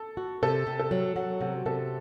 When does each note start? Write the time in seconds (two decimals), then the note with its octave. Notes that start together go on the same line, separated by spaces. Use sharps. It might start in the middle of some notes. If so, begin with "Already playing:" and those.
Already playing: A4
0.17 F#4
0.43 C3 A4
0.67 C3
0.79 A4
0.91 F#3
1.16 F#3 F#4
1.41 C3 F#4
1.66 C3 A4